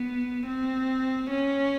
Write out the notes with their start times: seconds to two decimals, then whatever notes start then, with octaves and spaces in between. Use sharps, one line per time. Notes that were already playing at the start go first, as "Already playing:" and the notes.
Already playing: B3
0.47 C4
1.30 C#4